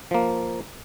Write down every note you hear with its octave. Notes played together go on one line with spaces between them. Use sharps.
F3 A#3